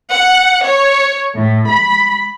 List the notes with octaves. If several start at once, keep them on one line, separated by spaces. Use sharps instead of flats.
F#5
C#5
A2
B5